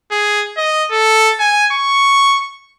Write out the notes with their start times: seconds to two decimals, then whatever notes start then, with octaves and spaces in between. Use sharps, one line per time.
0.11 G#4
0.57 D#5
0.91 A4
1.40 G#5
1.73 C#6